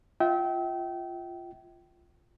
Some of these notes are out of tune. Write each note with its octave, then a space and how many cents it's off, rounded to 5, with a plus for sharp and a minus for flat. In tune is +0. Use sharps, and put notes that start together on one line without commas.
F4 -5 E5 -35 G5 -25